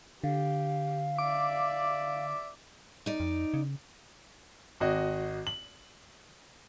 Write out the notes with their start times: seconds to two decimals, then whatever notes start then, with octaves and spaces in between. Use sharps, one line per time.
0.24 D3 G4 F5
1.18 D5 E5 D6
3.06 D#4 D5
3.20 F2
3.54 C#3
4.80 G#1 F#4 D#5
5.47 F#7